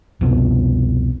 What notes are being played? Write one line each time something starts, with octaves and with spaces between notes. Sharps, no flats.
C2 F2 B2